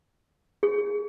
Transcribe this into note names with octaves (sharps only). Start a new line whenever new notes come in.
G#4